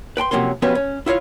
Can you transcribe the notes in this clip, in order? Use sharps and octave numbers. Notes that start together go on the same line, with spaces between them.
B4 G5 A5 C6
F#2 C3 F3 A#3 C#4 C6
F3 B3 C#4 F#4 G4 B4
C#4
E4 F4 C#5 F5